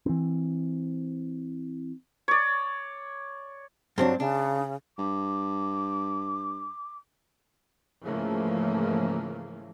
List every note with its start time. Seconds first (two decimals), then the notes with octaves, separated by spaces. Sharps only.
0.06 E3 C4
2.28 C#5 D5
3.98 G2 F#3 C4 D4
4.20 C#3 D4
4.98 G2 D6
8.05 G#2 C#3 E3 F3 A3 A#3